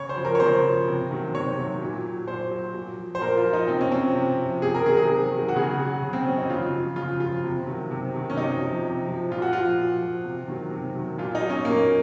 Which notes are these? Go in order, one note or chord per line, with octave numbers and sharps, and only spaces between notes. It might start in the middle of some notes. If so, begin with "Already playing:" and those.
Already playing: C#3 C#5
C5
F3
A#4
C#5
C#3 C5
F3
C3
D#3 F#3
C3 C#5
D#3 F#3
A#2
F#3
A#2 C5
F#3
A#2
F3
C5
A#2 A#4
F4
F3
D#4
C3 C4
C#4
F3 C4
C3
F3
C3 G#4
A#4
D#3 F#3 G#4
G#4
C3
D#3 F#3
F#4
C#3 G#4
F#3 F#4
C#3
C4
F#3 C#4
D#4
C#3 F4
F3
C#3 F4
F3 F4
C3
D#3 F#3
C3
D#3 F#3
C#4
C3 D#4
F3
C3
F3
A#2 F4
F#4
F3 F4
A#2
F3
C3
D#3 F#3
C3
D#3 F#3
A#2 F4
D#4
F#3
C#4
A#2 A#3